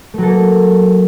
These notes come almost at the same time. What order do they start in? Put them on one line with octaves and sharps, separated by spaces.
A3 F#3 A4 A#3